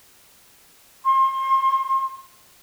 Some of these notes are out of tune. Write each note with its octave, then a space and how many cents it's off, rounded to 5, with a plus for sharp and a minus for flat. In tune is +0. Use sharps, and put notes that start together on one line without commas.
C6 +30